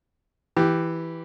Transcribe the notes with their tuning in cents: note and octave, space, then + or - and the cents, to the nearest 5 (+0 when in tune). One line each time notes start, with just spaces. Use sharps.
E3 +0 G4 +0